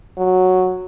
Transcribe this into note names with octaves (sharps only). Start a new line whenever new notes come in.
F#3